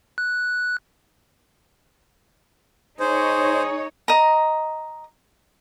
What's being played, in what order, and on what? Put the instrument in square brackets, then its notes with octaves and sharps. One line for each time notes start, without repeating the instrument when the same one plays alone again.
[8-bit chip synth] F#6
[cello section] D#4 C#5 [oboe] G#4 [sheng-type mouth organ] C5
[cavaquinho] D#5 A#5